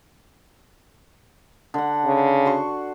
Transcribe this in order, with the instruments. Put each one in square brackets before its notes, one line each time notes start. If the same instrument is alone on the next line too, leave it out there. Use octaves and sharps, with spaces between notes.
[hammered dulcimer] D3 F#5
[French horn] C#3
[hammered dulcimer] F#4 C6 C#6